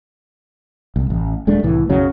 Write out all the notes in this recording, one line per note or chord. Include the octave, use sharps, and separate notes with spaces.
C2
A1
D#1 G#3 A3 D4
C2 A2 E3
B1 F#2 C#3 F#3